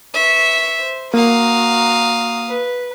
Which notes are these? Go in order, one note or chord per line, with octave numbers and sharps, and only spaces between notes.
B4 E5 C#6
C5
A#3 F#4 F5 A#5 D#6
B4